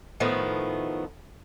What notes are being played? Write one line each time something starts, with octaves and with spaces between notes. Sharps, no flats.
A2 D#3 F3 A3 B3